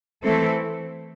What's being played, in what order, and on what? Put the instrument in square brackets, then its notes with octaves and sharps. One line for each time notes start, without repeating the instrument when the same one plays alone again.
[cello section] E3 A3 C4 E4 A4